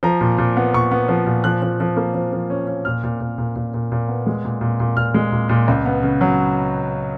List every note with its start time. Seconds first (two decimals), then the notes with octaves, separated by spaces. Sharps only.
0.03 F3 A#5
0.21 A#2
0.38 A#2
0.57 B3
0.74 A#2 C#6
0.91 B3
1.08 F3
1.27 A#2
1.44 F3 F#6
1.62 F3
1.80 F3
1.97 A#3
2.14 F3
2.33 F3
2.50 C#4
2.67 C#4
2.85 A#2 F6
3.04 A#2
3.20 A#2
3.38 A#2
3.56 A#2
3.74 A#2
3.92 A#2
4.08 B3
4.26 G#3
4.45 A#2
4.61 A#2
4.80 A#2
4.97 A#2 F6
5.14 G#3
5.32 A#2
5.49 A#2
5.68 C#2
5.86 B3
6.03 C#3
6.21 F#3